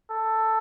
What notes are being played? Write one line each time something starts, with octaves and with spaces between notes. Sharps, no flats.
A4